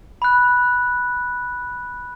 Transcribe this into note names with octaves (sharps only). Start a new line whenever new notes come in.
B5 F#6